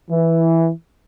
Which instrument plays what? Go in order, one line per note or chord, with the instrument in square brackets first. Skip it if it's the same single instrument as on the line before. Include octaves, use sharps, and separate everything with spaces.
[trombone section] E3